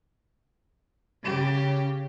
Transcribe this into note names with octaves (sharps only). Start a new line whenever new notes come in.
C#3 G4